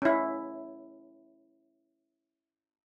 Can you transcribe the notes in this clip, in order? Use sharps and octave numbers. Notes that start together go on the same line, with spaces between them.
C#4 E4